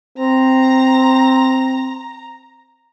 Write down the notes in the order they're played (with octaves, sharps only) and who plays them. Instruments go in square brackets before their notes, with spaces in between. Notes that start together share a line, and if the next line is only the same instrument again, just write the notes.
[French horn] C4 [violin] A#5